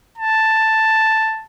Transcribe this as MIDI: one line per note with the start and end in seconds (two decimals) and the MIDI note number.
0.18 1.45 81